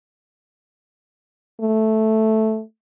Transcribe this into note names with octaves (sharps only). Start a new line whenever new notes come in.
A3